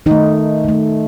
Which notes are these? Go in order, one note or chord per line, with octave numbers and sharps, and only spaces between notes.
D#3 A3 D#4
D#3 A3